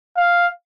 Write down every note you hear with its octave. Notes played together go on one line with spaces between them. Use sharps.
F5